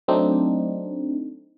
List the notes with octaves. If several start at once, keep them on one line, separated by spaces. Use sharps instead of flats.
F#3 A3 C4 D4 D#4